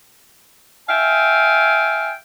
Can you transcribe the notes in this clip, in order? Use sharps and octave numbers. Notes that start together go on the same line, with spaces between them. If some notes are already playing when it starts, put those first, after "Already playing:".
E5 F5 G5 G#5